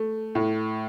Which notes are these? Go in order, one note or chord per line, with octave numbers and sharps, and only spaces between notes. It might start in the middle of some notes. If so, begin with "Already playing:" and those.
Already playing: A3
A2